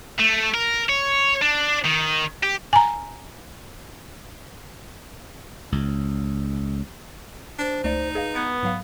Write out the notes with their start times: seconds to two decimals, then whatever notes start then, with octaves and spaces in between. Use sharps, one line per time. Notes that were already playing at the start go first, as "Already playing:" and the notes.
0.20 A3
0.54 A#4
0.89 C#5
1.42 D4
1.85 D#3
2.43 G4
2.73 G#5 A#5
5.72 C#2
7.59 D4 C5
7.84 C#2 A3 D#4 D5
8.15 G#4 B4 D#5 F5
8.35 B3 F#6 G#6 C#7
8.63 G#2 F#3 F5